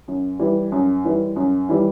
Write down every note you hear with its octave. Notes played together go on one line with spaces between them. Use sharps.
F#2
E3 G3
F#2
E3 G3
F#2
E3 G3